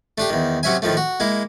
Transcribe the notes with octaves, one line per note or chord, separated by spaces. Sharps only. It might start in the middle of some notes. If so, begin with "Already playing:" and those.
A3 D4 G4
E2 D#3
C3 F#3 C#4 E5 G#5
A2 D#3 F3 A3
F#4
G#3 A#3 E4